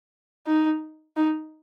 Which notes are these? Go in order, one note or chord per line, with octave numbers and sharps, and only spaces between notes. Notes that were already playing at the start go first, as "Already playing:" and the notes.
D#4
D#4